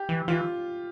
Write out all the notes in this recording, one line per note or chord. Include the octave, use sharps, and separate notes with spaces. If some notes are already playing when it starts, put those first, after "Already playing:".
Already playing: G4
E3
E3 F4